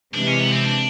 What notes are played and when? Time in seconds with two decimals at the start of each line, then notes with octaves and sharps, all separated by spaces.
0.14 C3 E3 G#3 D4
0.28 C#4
0.40 B3
0.52 C4
0.65 D4